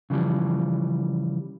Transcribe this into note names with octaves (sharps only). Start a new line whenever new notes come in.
C#3 E3 F3 G3